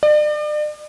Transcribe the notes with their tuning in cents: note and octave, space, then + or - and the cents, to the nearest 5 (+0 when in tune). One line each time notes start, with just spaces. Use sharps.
D5 +40